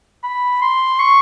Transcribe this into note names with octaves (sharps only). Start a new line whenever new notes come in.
B5
C6
C#6